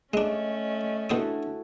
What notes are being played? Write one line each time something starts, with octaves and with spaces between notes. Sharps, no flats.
G#3 A3 C#4 D4 D#5
B2 D4 E4 F#4 A4 C5 D#6